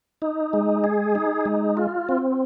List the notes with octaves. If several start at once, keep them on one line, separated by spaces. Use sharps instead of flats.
D#4
G#3
G#4
D#4
G#3
F4
C4